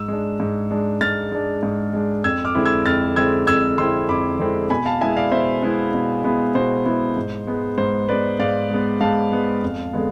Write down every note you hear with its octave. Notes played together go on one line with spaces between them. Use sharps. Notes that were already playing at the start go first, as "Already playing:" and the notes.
Already playing: G#2 E6
G#3 D4
G#2
G#3 D4
G#2 F6 A6
G#3 D4
G#2
G#3 D4
F2 E6 G#6
D6 F6
D3 G#3 C4 E4
E6 G#6
F2 F6 A6
D3 G#3 C4 E4 E6 G#6
F2 E6 G#6
D3 G#3 C4 E4 C6 E6
F2 B5 D6
D3 G#3 C4 E4
B2 G#5 B5
F5 A5
G#3 B3 E4 E5 G#5
D5 F5
B2 C5 E5
G#3 B3 E4
B2
G#3 B3 E4
B2 C5
G#3 B3 E4
G#2
G#3 B3
G#2 C5
G#3 B3 B4 D5
G#2 D5 F5
G#3 B3
G#2 F5 A5
G#3 B3
F2
D3 G#3 B3